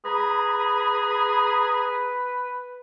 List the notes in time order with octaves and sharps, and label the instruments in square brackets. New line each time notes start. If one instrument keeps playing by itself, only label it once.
[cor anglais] G#4 [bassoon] B4 [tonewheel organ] A#5 B5